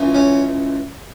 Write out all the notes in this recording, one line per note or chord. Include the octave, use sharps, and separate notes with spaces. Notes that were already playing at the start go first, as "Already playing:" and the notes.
Already playing: C#2 C#3 E3
C#4